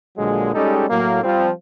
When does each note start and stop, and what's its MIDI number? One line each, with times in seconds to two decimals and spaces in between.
0.17 0.53 34
0.17 0.53 46
0.17 0.53 50
0.17 0.53 54
0.17 0.53 56
0.54 0.85 55
0.54 0.85 56
0.54 0.85 61
0.54 0.85 63
0.54 0.85 67
0.54 0.85 69
0.89 1.22 45
0.89 1.22 54
0.89 1.22 58
1.23 1.49 53
1.23 1.49 55
1.23 1.49 60